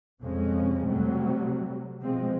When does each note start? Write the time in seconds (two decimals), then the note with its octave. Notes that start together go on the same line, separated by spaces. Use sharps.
0.21 F2 C3 G#3 C#4
0.87 C3 F#3 G3 A3
2.03 B2 F3 G#3 C4